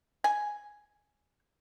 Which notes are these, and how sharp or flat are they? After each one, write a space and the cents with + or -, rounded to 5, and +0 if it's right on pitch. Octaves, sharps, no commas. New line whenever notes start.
G#5 +0